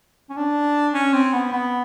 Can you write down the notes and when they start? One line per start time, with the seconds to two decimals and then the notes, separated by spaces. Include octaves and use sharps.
0.30 C#4
0.37 D4
0.94 C#4
1.13 C4
1.33 B3
1.52 B3